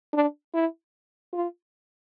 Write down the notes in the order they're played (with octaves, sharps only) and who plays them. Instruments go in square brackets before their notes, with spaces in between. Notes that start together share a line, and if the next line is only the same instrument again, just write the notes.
[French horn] D4
E4
F4